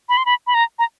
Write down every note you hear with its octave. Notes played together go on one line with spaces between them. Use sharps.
B5
C6
B5
B5
A#5
A#5